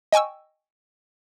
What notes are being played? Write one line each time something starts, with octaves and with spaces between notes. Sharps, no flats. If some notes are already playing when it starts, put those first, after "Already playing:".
D#5 G5 G#5 C#6 E6